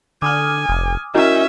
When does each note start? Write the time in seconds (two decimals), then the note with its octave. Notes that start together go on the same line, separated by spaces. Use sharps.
0.22 D3 G#5 D6 D#6 F6
0.69 F1
1.14 C#4 E4 F#4 A#4 D#5 E5